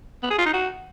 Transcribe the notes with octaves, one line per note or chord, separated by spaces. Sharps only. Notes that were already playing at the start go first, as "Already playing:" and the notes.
B3
G#4
F4
D#4
F#4